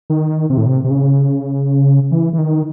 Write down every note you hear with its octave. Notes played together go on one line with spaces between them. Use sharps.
D#3
C3
A2
C3
C3
C#3
E3
E3
D#3